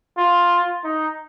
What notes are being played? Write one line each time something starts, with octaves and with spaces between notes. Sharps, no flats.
F4
D#4